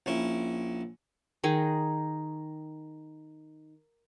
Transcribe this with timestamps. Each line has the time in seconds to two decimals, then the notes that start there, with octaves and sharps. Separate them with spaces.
0.06 A#1 C#4 E4
1.44 D#3 D#4 G#4